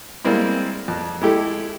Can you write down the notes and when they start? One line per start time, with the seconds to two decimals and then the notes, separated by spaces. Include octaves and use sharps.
0.25 G3 G#3 A#3 C4 E4
0.88 F2
1.22 G#3 A3 E4 G4 A4